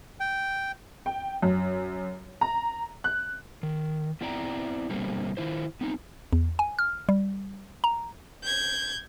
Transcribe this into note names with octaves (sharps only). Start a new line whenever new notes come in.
G5
G5
F#2
A#5
F#6
D#3
B3 C4 E4 D5 G5 A#5
B2 D3 G3 A#3 C4
D#3 E4 C5
B3 C4 D#4
E2
G#5
F6
G3
A#5
G6 G#6